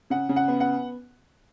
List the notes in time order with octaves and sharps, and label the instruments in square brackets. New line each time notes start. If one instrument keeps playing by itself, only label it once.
[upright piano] C#3 F#5
C#3
F#5
B3
F#5